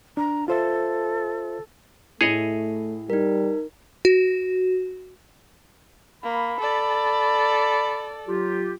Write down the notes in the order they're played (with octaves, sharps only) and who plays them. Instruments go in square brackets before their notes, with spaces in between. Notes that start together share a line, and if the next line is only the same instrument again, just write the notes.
[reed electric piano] D4 [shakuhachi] A#5
[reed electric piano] F4 C5 E5 [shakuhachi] A4
[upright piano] A2 E4 [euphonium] A3 [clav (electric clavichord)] G#4 C#5 D#5
[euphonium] G3 [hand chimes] D#4 A#4
[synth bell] F#4
[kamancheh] A#3 [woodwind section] B5
[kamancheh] A4 D5
[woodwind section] F#3 F4 G4